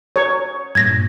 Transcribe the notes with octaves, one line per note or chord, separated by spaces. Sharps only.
C#5
G2 A#2 G#6 A#6